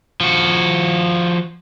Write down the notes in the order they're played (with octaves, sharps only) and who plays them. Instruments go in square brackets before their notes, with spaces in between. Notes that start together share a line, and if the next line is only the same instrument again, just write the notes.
[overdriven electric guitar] F3 F#4